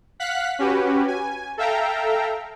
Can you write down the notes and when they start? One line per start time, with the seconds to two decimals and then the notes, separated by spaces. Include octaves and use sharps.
0.20 F5 F#5 F#6 B6
0.59 C#4 F#4 G4 B4
1.08 G#5
1.58 A4 E5 F5 G5 A#5